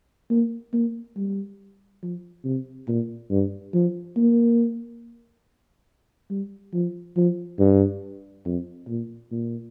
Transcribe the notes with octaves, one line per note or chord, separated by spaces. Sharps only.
A#3
A#3
G3
F3
C3
A#2
G2
F3
A#3
G3
F3
F3
G2
F2
A#2
A#2